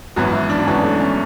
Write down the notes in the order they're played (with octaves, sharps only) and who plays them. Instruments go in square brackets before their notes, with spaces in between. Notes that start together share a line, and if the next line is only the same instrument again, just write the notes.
[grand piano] G#1 F#2 E3 B3 [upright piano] F#4
[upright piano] E4
D4
D4
[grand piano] G#1 F#2 E3 B3 [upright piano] C#4
[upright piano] A3
C#4